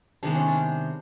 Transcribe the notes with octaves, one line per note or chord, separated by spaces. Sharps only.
C3 D#3 G#3 B3 D4
C#4
D4